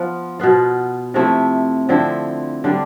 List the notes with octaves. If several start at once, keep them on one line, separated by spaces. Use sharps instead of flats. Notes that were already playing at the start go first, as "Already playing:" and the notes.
Already playing: F3 B3 F4
B2 B3 F4
C3 F3 A3 E4
D3 F3 C4 E4
D3 G3 D4